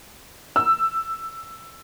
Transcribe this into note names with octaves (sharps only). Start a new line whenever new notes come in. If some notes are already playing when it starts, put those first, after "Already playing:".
E6